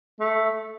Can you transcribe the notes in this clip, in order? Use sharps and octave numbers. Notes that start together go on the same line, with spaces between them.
A3